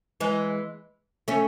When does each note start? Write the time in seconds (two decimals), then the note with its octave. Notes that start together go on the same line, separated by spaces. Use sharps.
0.20 E3 G#3
1.28 A3 C#4